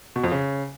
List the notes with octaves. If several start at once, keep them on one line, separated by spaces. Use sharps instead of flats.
B2
F2
C#3